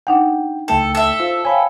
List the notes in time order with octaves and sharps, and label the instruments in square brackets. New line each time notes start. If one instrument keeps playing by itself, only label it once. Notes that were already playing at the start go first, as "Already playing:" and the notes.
[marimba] D4 D#4 F#5 [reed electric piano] G5
[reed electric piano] C#2 A3 G5 [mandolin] A4
[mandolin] A4 E5
[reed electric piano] F4 [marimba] C5
[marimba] C#5 F5 G5 [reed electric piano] G#5 B5